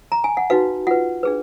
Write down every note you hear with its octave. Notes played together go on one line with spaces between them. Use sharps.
A#5
G#5
F#5
D#4 F#4 B4 F5
F4 B4 F#5
D4 G#4 B4